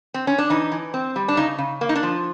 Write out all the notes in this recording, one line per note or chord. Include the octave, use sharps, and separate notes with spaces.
C4
C#4
D4
E3 D#4
E3
C4
G3
D4
C#3 D#4
C#3
A#3
D#4
D4
F3